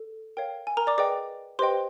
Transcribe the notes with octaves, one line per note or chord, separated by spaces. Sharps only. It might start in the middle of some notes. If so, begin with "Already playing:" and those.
Already playing: A4
A#4 C#5 F5 G5
G#5
A#4 A#5
D5 D6
G#4 B4 D5 D#5 G5 D6
G4 B4 C5 D#5 G5 C6